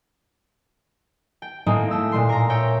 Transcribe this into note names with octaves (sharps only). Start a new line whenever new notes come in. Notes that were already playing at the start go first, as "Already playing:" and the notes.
G5
A2 G#3 A#3 C4 D#4
A3 E6
A#2 G#3 C6
A#4 A#5
C#5 E5 G5